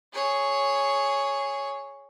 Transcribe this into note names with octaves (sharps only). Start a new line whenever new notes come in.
G#4 C#5